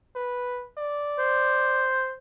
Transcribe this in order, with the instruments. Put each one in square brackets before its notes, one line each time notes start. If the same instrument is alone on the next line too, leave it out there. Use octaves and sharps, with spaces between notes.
[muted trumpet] B4
D5
[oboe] C5